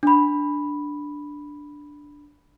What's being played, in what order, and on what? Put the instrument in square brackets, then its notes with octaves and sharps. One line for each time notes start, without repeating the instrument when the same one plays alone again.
[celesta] D4 B5